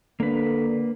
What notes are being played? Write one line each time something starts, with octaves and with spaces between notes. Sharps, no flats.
D3 A#3 B4